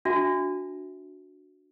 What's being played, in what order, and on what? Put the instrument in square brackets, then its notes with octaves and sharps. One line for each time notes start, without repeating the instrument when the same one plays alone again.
[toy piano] D4 F#4 E5 A5